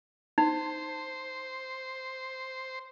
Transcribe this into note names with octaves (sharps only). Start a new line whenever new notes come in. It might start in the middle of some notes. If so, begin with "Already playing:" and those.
D#4 C5